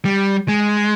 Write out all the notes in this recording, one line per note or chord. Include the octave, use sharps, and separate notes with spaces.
G3
G#3